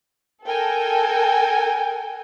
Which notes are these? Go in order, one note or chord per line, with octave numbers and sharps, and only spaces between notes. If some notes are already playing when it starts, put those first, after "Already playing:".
A4 A#4 G5 G#5